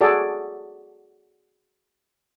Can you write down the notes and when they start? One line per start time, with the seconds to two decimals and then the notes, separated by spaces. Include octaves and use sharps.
0.01 F#4 G#4 A4 D5